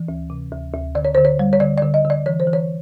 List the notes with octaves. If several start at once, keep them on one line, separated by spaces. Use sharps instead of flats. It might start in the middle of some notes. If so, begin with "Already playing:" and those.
Already playing: E3
D2
C3
D2
D2
D3 D5
C#5
D3 C5
C#5
G3
C#5
D3 D5
D5
D3
D#5
D3
D5
E3 C#5
C5
E3
C#5